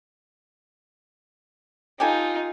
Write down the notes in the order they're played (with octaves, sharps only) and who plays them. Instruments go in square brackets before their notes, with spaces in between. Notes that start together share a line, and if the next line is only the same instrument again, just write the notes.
[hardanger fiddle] D#4 F4 [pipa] G4 A4 G#5